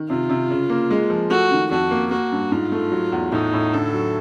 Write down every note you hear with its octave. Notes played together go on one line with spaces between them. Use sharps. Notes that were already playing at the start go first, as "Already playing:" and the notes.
Already playing: D#3
C3 F4
C3
C#3
A#3
G#3
F3
A3 F#4
D#3
F2 F#4
A#3
A#3 F#4
G2
G#2 F4
A3
F#3
E2
A2 D#4
A2
D3 A4
F#3